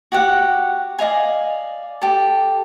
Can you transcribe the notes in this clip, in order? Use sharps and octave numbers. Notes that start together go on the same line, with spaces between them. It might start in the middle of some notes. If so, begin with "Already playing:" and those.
F#4 G4 F#5
D5 D#5 F5 G#5
G4 A4